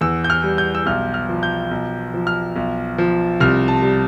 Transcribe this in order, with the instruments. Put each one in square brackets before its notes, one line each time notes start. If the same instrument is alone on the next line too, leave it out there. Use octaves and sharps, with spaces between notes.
[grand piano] E2 E6
G6
F6
G3
G6
E6
B1 F6
F6
F3
G6
B1
F3
F6
B1
F3
C2 F6
A5
G3